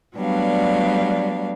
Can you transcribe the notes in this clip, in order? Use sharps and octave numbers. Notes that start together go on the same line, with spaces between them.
F#3 G3 A3 B3 D4 F5